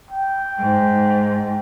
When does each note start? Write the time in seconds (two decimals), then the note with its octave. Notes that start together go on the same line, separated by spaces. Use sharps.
0.11 G5
0.57 G#2